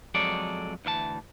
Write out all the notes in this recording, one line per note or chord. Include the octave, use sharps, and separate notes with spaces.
F2 F#3 G#3 A4 D5
D2 E3 E5 A5